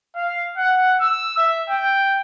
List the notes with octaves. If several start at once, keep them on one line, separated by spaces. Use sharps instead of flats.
F5
F#5
E6
E5
G5